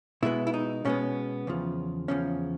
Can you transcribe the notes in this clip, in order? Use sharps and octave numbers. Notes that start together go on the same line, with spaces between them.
B2 G#3 B3 E4
E4
D#4
B2 G#3 B3 C#4
E2 C#3 F3
E2 C#3 F3 C#4